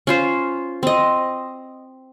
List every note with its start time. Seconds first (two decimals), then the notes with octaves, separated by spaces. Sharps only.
0.07 C#4 F4 C5
0.83 C4 D#5